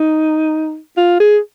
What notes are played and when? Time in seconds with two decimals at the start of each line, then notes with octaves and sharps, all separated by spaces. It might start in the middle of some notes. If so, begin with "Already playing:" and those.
Already playing: D#4
0.97 F4
1.20 G#4